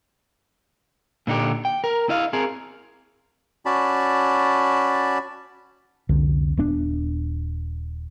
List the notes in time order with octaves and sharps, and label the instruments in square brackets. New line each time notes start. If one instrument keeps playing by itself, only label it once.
[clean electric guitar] A#2 D3 D#4 G4
G5
A#4
E4 D#5 F5
C4 G#4 A#4
[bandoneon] C#4 F#4 D5 A5 B5
[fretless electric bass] C2 F2 D3
D#1 B3 D4